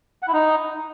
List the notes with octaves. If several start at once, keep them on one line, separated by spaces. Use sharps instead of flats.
F#5
E4
D#4